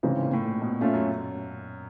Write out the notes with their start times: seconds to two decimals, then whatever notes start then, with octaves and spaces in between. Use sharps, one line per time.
0.03 G#2 C#3 E3 G#3 C4
0.22 A#2
0.33 A2
0.42 A#2
0.61 B2
0.81 A#2 A3 C#4 F4
0.94 F#2